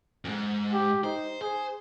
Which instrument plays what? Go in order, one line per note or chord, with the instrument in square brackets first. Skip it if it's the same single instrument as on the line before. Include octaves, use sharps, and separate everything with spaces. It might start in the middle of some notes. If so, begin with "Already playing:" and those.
[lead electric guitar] F2 G#2
[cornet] G4
[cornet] D#4 [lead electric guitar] C5
[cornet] G#4 [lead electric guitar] C5